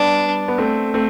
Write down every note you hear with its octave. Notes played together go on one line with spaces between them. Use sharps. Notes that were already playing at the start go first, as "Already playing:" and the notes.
Already playing: G3 B3 D4
B3
A3 C4
A3 C4